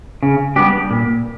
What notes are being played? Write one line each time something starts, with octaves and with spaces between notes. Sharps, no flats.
C#3
G3 B3 D4 G4
A#2